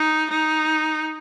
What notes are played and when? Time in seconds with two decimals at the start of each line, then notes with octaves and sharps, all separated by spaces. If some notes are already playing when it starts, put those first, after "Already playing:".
Already playing: D#4
0.30 D#4